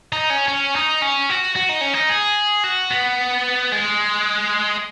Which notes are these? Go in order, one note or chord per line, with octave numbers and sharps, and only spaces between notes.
D#4
C#4
C#4
D#4
C#4
F#4
F#4
D#4
C#4
D#4
G#4
F#4
B3
G#3